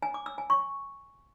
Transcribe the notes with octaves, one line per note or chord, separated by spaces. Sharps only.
G#5
D6
E6
G#5
C#6